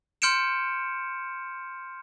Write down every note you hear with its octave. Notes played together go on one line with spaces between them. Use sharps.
C6 F6 G6 C#7 D7 E7